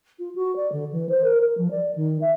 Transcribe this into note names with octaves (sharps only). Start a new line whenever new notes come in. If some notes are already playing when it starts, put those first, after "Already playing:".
F4
F#4
D5
D3
E3
C5
A#4
A#4
F3
D5
D#3
E5